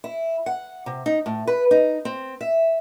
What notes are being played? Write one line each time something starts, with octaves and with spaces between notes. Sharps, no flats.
E4
F#5
C3
D#4
A2
B4
D#4
C4
E5